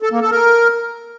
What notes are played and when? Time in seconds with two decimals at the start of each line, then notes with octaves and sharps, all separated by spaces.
0.02 A4
0.12 A#3
0.21 A4
0.31 A#4